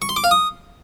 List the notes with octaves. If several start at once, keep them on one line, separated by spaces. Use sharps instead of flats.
C#6
C6
D6
F5
D#6